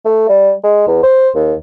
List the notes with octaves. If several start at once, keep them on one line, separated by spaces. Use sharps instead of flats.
A3
G3
G#3
E2
C5
D#2